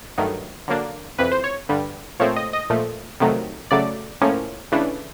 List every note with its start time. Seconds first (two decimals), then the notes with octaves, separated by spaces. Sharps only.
0.18 G2 D#3 F#3 A3
0.68 D3 F#3 A#3 D4
1.18 F2 C3 E3 B4
1.32 C5
1.44 C#5
1.69 G2 D3 G3
2.20 A#2 F3 A3 C4 C#5
2.36 D#5
2.53 D#5
2.70 A#2 F3 A3
3.20 F2 C3 D#3 F#3 A3
3.71 C#3 F#3 A3 D5
4.21 A2 F3 A#3 C#4
4.72 C#3 E3 A3 D4